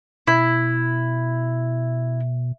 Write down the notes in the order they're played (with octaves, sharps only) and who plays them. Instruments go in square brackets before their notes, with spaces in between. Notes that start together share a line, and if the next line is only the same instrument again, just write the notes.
[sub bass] B2 [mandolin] E4